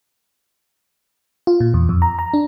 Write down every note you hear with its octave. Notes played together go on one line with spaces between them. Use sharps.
F4
A#2
E2
F2
A#5
A#5
D4